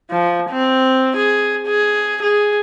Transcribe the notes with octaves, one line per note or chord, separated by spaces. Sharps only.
F3
C4
G#4
G#4
G#4